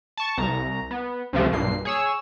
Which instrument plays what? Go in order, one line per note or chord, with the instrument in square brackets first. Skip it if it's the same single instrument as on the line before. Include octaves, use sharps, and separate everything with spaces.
[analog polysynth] A5 C#6
C2 A#5
B3
C#2 C3 F3 A3
B1 G2 A#2 C7
G#4 C#5 E6